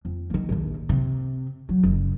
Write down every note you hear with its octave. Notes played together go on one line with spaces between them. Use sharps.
F2
D#3 A#3
A#1 D#2
C3
F#3
F#1